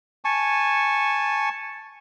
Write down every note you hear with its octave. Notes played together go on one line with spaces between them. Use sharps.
G#5 A5 C#6